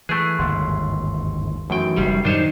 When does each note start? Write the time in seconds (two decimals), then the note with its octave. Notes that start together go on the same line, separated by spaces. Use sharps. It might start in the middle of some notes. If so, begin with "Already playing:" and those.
0.09 E3 A3 G#4 F#6 D7
0.39 G1 D#2 G#2 C6
1.70 F#2 D#3 E3 A3 F#4 G5
1.97 F1 G3 G4 C7
2.25 F#2 A2 C3 D#3 D4 D#4 C5 C#5